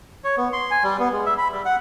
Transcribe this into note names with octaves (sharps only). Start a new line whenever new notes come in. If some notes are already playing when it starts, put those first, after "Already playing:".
C#5
B3
C6
G#5
G3
B3
G#3
E5
B5
G3
F#5